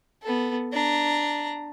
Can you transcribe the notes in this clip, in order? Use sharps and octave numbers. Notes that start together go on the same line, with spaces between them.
B3 A4
D4 A#5